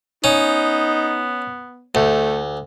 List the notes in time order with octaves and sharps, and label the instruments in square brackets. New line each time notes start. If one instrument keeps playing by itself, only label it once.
[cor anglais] B3 [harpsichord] C#4 [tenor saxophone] D#4
[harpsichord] D2 [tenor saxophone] A3